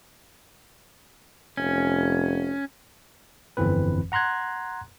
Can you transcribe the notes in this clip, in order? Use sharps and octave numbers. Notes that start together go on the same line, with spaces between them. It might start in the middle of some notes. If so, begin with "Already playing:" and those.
F1 C#4
G1 F2 E3 C4 B4
F#5 A#5 C6 F#6 G#6